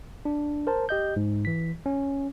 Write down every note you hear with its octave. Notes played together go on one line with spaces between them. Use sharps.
D4
A#4 C5 A5
G4 D#5 G6
G#2
E3 B6
C#4